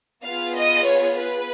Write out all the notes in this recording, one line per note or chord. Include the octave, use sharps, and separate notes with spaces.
B3 F4 G#4 F5
D#5
C#5
B4